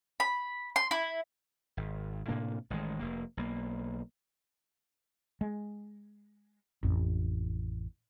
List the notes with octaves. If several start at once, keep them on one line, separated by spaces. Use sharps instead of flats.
B5
C6
E4
G#1
A2 C3 A#3 D4
A1 D#3 G3 G#3
F1 A#3
B1 A#3
G#3
A1 F2